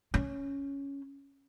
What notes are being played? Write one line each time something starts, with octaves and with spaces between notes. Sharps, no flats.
C#4